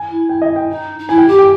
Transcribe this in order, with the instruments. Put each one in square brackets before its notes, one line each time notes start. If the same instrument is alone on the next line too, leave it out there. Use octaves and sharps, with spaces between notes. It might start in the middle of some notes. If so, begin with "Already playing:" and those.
Already playing: [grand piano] G#5
[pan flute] E4
[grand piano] G5
D#5
G5
[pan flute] D#4
D#4
[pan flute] E4 [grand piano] G#5
[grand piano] G5
[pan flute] G4
[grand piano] G5